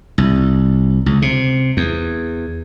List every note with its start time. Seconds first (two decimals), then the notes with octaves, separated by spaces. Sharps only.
0.18 C2
1.06 C#2
1.22 C3
1.77 E2